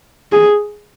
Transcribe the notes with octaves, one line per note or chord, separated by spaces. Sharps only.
G#4